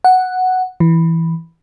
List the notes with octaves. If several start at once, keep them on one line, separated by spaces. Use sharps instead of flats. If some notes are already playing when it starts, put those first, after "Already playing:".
F#5
E3